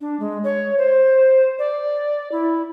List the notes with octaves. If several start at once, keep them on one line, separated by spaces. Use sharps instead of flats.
D4
G#3
C#5
C5
D5
E4